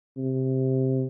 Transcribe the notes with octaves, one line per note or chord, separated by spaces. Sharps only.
C3